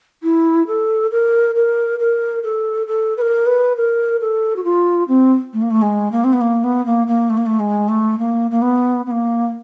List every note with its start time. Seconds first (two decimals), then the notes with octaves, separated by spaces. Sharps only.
0.23 E4
0.67 A4
1.11 A#4
1.55 A#4
1.99 A#4
2.43 A4
2.87 A4
3.17 B4
3.21 A#4
3.46 B4
3.77 A#4
4.21 A4
4.56 F#4
4.64 F4
5.08 C4
5.53 A3
5.62 A#3
5.70 A3
5.82 G#3
6.12 A#3
6.24 C4
6.33 B3
6.41 A#3
6.64 B3
6.86 A#3
7.07 A#3
7.30 A3
7.37 A#3
7.46 A3
7.60 G#3
7.89 A3
8.19 A#3
8.51 A#3
8.62 B3
9.06 B3
9.11 A#3